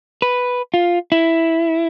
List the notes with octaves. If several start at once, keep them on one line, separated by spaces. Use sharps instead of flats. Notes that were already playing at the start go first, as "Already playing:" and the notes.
B4
F4
E4